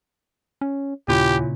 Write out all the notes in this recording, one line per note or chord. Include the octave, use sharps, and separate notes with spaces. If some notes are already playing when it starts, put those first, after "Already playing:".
C#4
D#2 A#2 C#3 C#4 E4 F4 G4